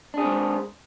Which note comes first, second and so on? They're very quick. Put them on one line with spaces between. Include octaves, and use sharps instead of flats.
D4 G#4 C4 G#3